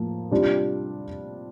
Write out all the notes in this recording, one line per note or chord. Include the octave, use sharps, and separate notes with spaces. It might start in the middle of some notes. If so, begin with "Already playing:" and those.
Already playing: A2 F3 A#3
C3 G3 D4 F4